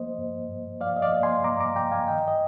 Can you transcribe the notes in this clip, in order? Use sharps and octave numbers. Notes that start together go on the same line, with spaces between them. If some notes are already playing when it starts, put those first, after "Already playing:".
Already playing: F3 A#3 C5 D#5
G2
G2
F3 D5 F5
D#5
D5 F5
A#3
G#5 C6
G2 A#5 D6
A#5 D6
G2 G5 A#5
F5 G#5
D#3 D#5 G5
D#5